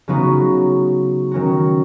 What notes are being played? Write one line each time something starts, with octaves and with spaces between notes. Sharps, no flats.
C#3 F#3 B3 D#4 F#4
D#3 F#3 C#4 F#4